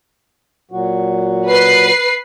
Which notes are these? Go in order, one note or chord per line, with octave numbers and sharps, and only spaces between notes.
A#2 F#3 F#4
B4 C7